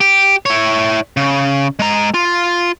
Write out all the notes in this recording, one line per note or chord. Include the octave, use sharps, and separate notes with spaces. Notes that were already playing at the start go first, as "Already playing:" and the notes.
G4
E4 C#5
C#3
G#3 A#5
F4